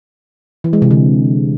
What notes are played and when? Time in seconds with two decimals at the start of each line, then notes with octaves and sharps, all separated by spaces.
0.64 E3
0.73 G#3
0.82 C3
0.91 D3